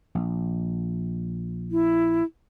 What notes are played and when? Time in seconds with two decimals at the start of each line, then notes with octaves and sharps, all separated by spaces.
0.15 A#1
1.71 E4